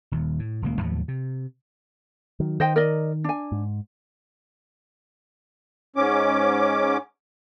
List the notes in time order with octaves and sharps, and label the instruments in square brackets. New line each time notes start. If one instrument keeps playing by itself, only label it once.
[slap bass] D#1 D#2
A2
D#1 C#2 A#3
D#2 A2 F3 F#3
C3
[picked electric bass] D#3 F#3
[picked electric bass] D#3 [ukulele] C5 D#5 G5
[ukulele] A#4 D5 D#5
D4 G#5
[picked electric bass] G#2
[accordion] G#2 C#4 D6